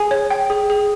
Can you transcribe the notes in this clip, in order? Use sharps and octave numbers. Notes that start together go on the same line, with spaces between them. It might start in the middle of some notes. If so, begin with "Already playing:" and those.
Already playing: G#4 G#5
C#5
G5
G#4
G#4